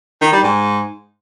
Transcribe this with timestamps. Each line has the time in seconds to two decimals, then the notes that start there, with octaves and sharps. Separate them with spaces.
0.22 D#3
0.32 G3
0.43 G#2